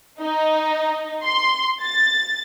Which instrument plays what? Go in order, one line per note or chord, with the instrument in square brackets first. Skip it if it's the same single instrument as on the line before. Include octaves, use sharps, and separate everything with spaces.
[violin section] D#4
C6
A6